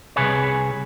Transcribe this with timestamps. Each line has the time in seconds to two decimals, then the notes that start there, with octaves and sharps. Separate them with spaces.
0.16 C2 G#2 C3 G#4 B4 C#5